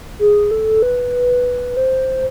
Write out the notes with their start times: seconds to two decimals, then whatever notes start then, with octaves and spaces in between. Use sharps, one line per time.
0.19 G#4
0.51 A4
0.82 B4
1.77 C5